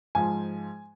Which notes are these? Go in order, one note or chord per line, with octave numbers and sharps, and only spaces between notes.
G#2 F3 G#5